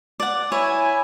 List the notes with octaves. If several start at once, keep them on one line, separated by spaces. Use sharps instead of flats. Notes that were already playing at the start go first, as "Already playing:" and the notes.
D5 F#5
E4 C#5 G#5